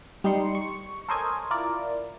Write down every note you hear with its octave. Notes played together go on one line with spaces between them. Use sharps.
G3 D#4 C6 C#7
C#6
A4 A#4 C5 C#5 D#5 G#5
E4 F4 A#4 D5